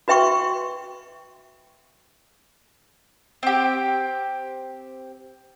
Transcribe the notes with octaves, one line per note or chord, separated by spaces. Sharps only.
F#4 B4 E5 G5 C6 C#6
C4 G4